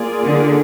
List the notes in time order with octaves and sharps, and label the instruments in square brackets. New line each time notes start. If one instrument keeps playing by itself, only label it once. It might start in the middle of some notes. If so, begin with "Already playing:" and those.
Already playing: [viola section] A#3 F4 G#4 D5
[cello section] D3